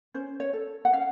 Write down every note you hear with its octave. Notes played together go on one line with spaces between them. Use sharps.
C#4 C5
C#5
A4
F#5
C#4 F5